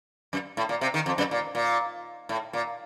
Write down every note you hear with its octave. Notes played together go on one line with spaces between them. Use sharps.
F#2
A2
A#2
C3
D#3
F2
F#2
A#2
A#2
A2
A#2